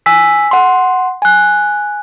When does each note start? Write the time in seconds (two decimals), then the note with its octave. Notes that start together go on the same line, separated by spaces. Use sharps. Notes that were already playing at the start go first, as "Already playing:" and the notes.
0.06 G#5 E6 B6
0.51 F#5 C6
1.22 G#5 F#6